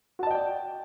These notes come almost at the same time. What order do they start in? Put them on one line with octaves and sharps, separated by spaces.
F#4 A5 D#5 G5 D5